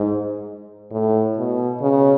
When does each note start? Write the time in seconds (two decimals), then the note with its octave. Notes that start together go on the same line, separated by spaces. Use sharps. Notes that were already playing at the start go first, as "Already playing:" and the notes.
Already playing: G#2
0.91 A2
1.37 B2
1.81 C#3